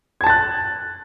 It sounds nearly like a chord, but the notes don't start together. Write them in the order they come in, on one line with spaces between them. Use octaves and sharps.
G#6 A5 A6 F#6